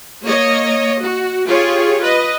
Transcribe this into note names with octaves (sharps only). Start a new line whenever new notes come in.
A#3 C#5 D#5
F#4
F4 G4 G#4 C#5
B4 D#5